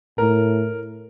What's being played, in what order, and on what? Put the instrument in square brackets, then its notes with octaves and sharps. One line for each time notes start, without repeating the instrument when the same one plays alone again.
[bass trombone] A2 [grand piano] A#4